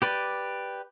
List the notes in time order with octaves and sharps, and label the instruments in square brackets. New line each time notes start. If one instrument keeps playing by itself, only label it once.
[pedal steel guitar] G4 B4 D5